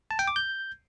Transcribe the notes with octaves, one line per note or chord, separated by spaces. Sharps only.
A5
G5
D6
G6